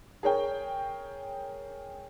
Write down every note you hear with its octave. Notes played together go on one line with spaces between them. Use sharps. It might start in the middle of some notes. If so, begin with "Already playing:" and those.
G#4 A#4 C#5 G5